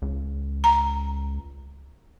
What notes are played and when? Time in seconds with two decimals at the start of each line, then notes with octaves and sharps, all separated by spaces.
0.02 C#2
0.64 A#5